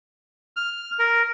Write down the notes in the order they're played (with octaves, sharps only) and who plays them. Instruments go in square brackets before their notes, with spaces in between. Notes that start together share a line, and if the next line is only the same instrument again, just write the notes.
[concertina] F6
A#4